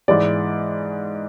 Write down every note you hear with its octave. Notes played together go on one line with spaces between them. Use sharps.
G#2 E3 G#3 D5